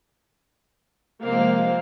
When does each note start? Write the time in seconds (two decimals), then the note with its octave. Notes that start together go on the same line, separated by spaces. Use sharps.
1.22 C3 F3 G#3 A#3 C4 F5